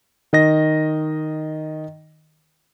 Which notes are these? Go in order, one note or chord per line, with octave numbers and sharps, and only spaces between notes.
D#3 D#5 A#6